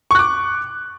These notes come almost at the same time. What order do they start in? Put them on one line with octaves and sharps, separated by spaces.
C#6 F#6 D6